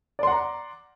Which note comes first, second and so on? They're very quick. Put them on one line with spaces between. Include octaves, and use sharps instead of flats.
D5 C6 F#5 A#5